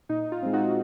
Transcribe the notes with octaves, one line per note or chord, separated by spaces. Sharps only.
A#2 D#4
F4
G#3 C4
D#4 F#4